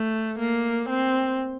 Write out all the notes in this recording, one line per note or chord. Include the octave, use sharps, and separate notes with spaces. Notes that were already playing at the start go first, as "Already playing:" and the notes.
Already playing: A3
A#3
C4